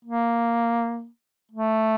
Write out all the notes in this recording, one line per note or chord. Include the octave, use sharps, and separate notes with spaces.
A#3
A3